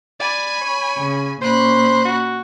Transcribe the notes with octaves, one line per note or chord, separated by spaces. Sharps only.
D5 G#5 B5
C#5
C#3
A#2 C#4 C5 B5 F#6
F#4